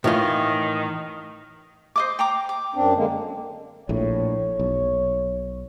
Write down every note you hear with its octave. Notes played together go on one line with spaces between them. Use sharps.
A2 D#3 E3 F4
C5 D#5 D6
G5 A#5 D6
D6
F#2 C4 D4
D3 G#3 A#3
A#1 A2 C#5
B1